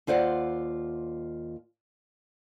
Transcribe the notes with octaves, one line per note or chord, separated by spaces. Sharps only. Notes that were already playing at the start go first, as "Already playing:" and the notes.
D#2 F4 C5 D5 F#5